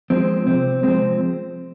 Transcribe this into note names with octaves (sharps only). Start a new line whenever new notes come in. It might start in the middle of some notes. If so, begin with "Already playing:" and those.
F3 G#3 C4
C3 C4
F3 G#3 C4